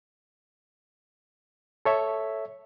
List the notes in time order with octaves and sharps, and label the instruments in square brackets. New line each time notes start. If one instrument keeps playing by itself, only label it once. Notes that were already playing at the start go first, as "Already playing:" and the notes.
[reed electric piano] A4 C#5 E5